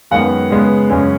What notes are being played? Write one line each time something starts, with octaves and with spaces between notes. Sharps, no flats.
F#2 D#3 G#3 B3 F#5
C#3 G#3 B3
F#2 C#3 G#3 C#4